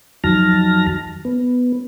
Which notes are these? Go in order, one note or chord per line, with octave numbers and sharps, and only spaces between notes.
F2 D#3 F#3 A5 F6 A#6
B3